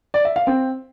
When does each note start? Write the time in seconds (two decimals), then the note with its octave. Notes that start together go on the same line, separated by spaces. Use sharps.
0.14 D5
0.25 E5
0.36 F5
0.47 C4